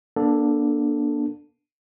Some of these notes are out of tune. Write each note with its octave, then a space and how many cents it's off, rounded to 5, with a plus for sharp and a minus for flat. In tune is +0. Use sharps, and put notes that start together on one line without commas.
A#3 +40 D4 +0 A4 +0